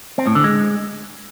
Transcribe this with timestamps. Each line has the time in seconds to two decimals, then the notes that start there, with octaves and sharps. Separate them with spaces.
0.18 C4
0.27 A2
0.35 D3
0.44 G#3